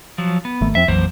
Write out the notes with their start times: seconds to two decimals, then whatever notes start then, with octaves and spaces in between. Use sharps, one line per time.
0.18 F3 F#3
0.45 B3
0.61 G#1 D#3 A3
0.75 F2 F3 C4 E5
0.88 A#1 F2 E3 F#3 A#3 C5